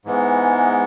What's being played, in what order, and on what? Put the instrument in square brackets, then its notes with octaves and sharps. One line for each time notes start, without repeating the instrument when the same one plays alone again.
[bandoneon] G#2 E3 G#3 B3